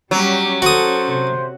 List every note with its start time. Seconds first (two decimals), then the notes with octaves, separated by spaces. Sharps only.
0.11 F#3 G3 C#4 G4
0.62 C#4 F#4 A4 C5 D#6
1.11 C3 C5